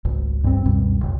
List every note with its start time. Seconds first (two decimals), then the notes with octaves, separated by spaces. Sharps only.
0.05 G#1 C#2
0.44 G2 C4
0.65 C#2 F#2 B2 G3
1.01 F#1 C#2